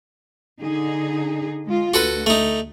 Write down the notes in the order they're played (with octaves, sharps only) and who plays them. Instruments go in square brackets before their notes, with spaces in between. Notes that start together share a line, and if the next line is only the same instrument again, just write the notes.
[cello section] D3 D#4 G#4
G#3 F4
[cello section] D2 [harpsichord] F#4 A4 B4
[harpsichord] A3 D#4